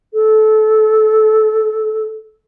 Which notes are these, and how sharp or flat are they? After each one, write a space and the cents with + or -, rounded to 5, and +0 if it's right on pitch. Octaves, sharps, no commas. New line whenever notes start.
A4 -20